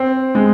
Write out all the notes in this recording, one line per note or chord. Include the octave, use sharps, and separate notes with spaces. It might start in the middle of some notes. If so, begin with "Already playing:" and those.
Already playing: C4
G#3